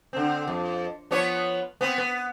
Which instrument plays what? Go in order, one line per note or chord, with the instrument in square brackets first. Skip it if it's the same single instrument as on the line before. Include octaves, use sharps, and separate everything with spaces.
[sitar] D3 C4
F2
F3 B3 C#5
B3 C4
B3